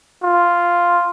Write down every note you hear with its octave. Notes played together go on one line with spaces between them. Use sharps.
F4